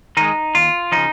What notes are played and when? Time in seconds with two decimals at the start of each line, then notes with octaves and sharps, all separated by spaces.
0.17 D#3 G#3 D#4
0.55 D#2 F4
0.92 C#3 F3 D#4